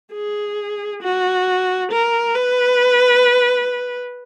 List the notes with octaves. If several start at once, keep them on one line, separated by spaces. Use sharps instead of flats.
G#4
F#4
A#4
B4